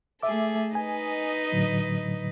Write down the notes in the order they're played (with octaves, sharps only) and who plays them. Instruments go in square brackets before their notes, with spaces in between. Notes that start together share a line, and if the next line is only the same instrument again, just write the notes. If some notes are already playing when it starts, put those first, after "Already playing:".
[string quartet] A3 G#4 A4 [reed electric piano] E5 D6
[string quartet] D#4 B4 D#5 [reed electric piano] G#5
[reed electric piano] A2 D3 F#3